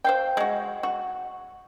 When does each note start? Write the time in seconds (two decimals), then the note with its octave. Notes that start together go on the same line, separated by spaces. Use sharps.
0.04 C5 F5 G5
0.37 G#3 F#4
0.83 F#4